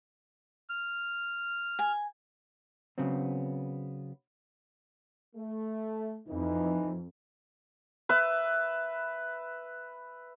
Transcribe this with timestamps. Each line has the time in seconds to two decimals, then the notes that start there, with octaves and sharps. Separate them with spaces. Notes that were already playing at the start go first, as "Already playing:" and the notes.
0.69 F6
1.79 G#5
2.98 C#3 F#3 B3 C4
5.36 A3
6.28 F2 E3 D#4
8.09 B4 E5